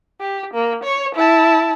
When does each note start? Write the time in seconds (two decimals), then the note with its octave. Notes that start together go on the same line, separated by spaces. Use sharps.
0.21 G4
0.54 A#3
0.84 C#5
1.15 E4 A5